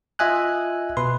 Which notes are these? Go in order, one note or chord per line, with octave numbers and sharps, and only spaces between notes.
F4 D#5 E5 G#5 F#6
B2 B4 C6